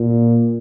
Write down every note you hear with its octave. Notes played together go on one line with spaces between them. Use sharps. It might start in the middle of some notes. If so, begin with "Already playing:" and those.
Already playing: A#2